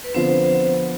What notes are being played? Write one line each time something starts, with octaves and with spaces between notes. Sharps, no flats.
B4
D3 F3 B3 C4 F4 C5